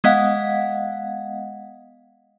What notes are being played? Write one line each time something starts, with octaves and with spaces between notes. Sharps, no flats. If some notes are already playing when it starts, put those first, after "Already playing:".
G#3 B3 D#5 F5 F#5